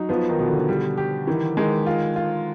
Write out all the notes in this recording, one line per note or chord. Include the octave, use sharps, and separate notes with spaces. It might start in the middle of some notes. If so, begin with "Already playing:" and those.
Already playing: F#3 D#4
F3 B3
D#3
B2
D3
G3
G4
D#3 E3
D#3 G#3
F4
F4